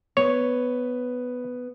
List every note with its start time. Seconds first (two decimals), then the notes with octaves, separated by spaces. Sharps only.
0.17 B3 B4 C#5